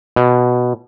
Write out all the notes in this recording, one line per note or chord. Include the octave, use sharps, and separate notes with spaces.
B2